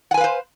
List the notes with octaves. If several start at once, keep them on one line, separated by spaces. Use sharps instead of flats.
B4 C5 F5 F#5 G#5